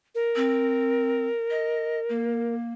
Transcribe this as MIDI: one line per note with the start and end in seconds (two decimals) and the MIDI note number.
0.15 2.54 70
0.36 1.26 60
1.50 2.00 75
2.09 2.73 58